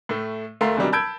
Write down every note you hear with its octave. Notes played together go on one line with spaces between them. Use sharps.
A2 A3
D2 A3 A#4 F5 C6
E2 C3 D#3 F#3 G3 D4
A5 B5 E6 G6 G#6 D7